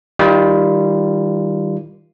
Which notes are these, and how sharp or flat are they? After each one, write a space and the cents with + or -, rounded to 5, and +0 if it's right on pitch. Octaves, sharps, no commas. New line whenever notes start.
D#3 +15 G3 +0 F4 -25